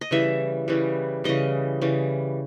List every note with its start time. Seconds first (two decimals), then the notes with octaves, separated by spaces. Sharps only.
0.01 D#5
0.11 C#3 E3 G3 E5
0.68 C#3 E3 G3
1.24 C#3 E3 G3 D#5
1.81 C#3 E3 G3